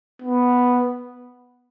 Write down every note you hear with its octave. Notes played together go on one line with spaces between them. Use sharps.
B3